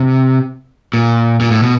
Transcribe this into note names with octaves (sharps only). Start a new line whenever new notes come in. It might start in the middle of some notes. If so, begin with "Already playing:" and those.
Already playing: C3
A#2
A#2
A2
B2